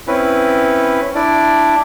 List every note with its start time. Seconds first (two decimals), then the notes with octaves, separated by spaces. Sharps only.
0.08 C4 C#4 E4 B4
1.15 D4 E4 D5